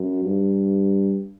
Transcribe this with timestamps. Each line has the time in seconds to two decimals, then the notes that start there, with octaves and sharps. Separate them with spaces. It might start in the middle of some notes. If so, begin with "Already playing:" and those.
Already playing: F#2
0.24 G2